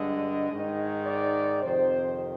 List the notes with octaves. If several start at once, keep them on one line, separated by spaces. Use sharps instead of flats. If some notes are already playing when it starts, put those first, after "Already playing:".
Already playing: G2 D3 G#3 D#5
G#2 D#3 G#3
D5
F2 C3 D#3 C5